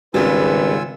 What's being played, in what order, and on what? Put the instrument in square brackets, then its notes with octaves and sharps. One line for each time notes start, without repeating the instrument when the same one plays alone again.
[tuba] G#1 [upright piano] C#2 C#3 G3 [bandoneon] F4 G#5 E6 [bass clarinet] B4